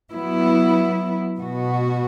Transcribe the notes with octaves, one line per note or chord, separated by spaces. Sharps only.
F#3 B3 E4
B2 B3 F#4